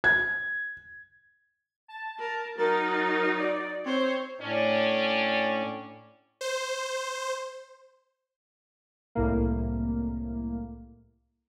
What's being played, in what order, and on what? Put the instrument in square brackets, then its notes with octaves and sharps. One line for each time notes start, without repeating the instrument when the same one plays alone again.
[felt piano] G#6
[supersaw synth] A5
[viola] A#4
[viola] F#3 D#4 [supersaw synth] A#4 A6
[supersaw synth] D5
[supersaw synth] C4 [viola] C5 C#5
[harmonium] A2 [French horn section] C#4 D4 D5
[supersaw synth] C5
[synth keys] C2 A2 A#3